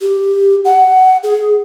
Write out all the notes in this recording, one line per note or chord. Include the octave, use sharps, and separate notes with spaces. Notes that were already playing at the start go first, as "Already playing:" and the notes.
G4
F#5
G#4